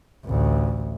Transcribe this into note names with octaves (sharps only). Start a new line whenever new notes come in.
A1 D2